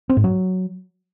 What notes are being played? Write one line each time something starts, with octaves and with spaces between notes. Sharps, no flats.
C4
G#2
F#3